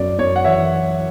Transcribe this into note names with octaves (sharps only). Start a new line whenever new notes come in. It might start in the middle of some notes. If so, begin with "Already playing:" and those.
Already playing: F#2 D5
F#2 C#5
F#5
E3 C#5 E5